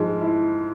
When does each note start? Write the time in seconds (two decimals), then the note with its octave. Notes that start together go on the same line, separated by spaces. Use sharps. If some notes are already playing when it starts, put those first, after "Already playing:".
Already playing: G#2 F3 G#3
0.21 E4